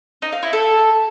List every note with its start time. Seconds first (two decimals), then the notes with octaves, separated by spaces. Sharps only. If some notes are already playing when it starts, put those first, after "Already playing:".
0.22 D#4
0.32 F5
0.43 E4
0.53 A4